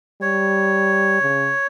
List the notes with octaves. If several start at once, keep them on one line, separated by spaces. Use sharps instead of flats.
G3 C#5
C#3